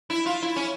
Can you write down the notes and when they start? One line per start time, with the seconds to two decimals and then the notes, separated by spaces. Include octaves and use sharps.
0.10 E4
0.26 F4
0.42 E4
0.56 C#4